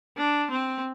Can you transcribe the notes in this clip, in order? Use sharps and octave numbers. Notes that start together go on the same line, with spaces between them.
D4
C4